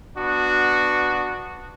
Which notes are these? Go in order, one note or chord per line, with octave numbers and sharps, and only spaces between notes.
B3 D4 F#4